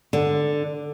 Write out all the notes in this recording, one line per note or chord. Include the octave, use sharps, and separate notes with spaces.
D3